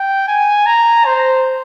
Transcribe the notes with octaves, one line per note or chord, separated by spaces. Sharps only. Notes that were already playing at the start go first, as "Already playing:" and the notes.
Already playing: G5
G#5
A#5
C5